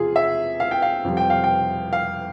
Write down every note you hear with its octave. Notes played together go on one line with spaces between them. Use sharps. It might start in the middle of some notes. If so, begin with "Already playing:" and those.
Already playing: E2 C3 F3 F4 G#4
E5
F5
G5
F5
F2 C3 G3
G5
F5
G5
F5